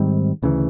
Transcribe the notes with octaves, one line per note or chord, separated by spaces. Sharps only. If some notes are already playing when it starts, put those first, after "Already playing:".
Already playing: G#2 D#3 G3 C4
D2 C#3 E3